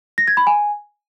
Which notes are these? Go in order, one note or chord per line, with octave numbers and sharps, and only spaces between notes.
A#6
G#6
B5
G#5